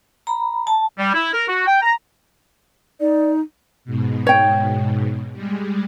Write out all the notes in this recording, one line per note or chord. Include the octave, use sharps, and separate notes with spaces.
A#5 B5
A5
G3
E4
A#4
F#4
G5
A#5
D#4 D5
G#2 B2
C#5 G5
G3 G#3